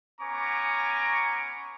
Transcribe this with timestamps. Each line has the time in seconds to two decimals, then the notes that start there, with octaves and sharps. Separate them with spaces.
0.21 B3 C#4 G#5 A#5 C#6 D6